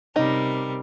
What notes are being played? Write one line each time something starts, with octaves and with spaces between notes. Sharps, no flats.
C3 G3 C#4 D#4 A#4